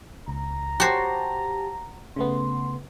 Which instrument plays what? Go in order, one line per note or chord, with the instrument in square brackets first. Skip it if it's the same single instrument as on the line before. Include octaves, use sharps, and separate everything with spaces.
[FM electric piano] C#2 [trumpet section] A#5
[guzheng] F#4 C5 [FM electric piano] G4 A5
[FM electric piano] C#3 A3 B3 [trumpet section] C6